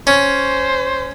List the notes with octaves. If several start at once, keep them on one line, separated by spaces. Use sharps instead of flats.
C#4 C5